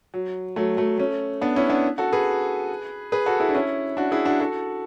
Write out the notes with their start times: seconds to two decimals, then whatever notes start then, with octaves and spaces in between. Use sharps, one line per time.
0.14 F#3
0.56 F#3 A3
0.77 F#3 A3
0.98 A3 C#4
1.41 B3 D4
1.56 C#4 E4
1.70 B3 D4
1.98 F#4 A4
2.12 G#4 B4
3.12 G#4 B4
3.26 F#4 A4
3.40 E4 G#4
3.49 D4
3.54 C#4 E4
3.97 D4 F#4
4.11 E4 G#4
4.25 D4 F#4
4.40 F#4 A4